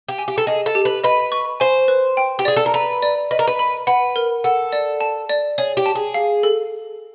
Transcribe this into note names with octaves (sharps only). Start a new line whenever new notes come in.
G4
G#5
G4
A4
G#4 D#5
A4
G4
B4
B4 D#5
C#6
C5 G#5
B4
G5
G4
G#4 D5
A4
A#4
B4 A#5
D5
B4 D#5
A#4
B4
B5
B4 F#5
A#4
A4 F#5
D5
A5
D5
G#4 C#5
G4
A5
G#4
F5
A4